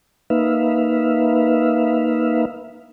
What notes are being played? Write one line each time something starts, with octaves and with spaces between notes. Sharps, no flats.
A#3 D#4 B4 E5 F5